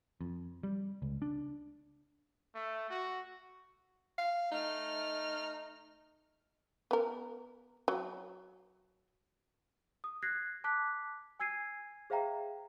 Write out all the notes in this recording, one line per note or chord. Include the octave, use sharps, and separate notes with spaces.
F2
G3
C#2
D4
A3
F#4
F5
A3 D#4 F6
B3 A#4
F#3
D#6
F#6 G#6 A#6 C7
A5 D6 F#6 B6
G#5 E6 G#6 C7 D#7
G#4 C5 E5 F5 G5 A#5